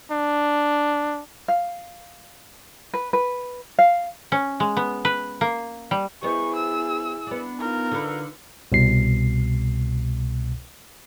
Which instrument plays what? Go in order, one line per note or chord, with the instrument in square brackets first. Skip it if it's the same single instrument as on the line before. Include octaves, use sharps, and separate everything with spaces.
[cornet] D4
[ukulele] F5
B4
B4
F5
[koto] C#4
G#3
B3
B4
A#3
G3
[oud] B3 C5 D#5 [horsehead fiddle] E4 G#4 [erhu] C#6
[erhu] E6
[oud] B3 D4
[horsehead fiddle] D#4 F4 [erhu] A#4
[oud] D3 B4
[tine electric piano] C2 B2 C7